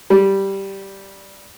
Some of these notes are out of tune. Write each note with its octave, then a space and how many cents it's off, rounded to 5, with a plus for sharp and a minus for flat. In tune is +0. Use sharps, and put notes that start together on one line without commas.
G3 -10